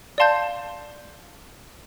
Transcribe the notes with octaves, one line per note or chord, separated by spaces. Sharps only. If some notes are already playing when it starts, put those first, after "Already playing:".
D5 F5 A5 C6 G6